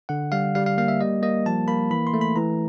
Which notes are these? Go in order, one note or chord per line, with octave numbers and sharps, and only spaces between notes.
D3 F#5
G3 F5
G3 F5
F5
A#3 F5
E5
G3 D#5
A#3 D#5
F3 A5
A#3 B5
E3 B5
C6
A3
B5
E3 A#5